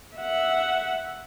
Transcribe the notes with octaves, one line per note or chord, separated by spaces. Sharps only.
E5 F#5